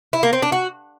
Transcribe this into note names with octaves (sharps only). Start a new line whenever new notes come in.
E4
A#3
C4
D4
F#4